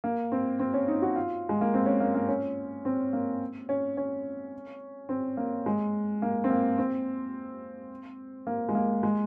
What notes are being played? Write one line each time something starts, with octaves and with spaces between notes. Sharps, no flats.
A#3
C4
C4
C#4
D#4
F#4
F4
G#3
A#3
C4
C#4
A#3
A#3
C#4
C4
A#3
C#4
C#4
C4
A#3
G#3
A#3
C4
A#3
C4
A#3
G#3
A#3
G#3